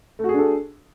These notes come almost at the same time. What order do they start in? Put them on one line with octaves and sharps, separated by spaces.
A3 F#4 G#4 D4 A4